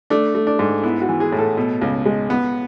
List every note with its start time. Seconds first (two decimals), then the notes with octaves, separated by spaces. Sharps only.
0.10 A3 D4
0.35 A3
0.47 D4
0.59 G#2
0.83 B3 E4
1.01 F#4
1.09 E3
1.20 G#4
1.32 A2
1.38 A4
1.57 B2
1.81 C#2
2.06 G#3
2.30 B3